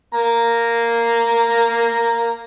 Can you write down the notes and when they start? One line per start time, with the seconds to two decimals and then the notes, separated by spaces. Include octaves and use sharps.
0.14 A#3 A#5